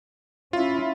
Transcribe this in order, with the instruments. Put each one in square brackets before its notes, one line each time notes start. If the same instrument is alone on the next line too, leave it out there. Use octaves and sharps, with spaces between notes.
[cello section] C#4 E4 [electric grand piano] F4